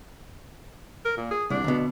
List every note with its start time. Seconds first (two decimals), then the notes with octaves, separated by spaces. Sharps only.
1.05 A#4
1.17 A#2
1.31 G#4
1.50 C2 D4
1.64 D2 B2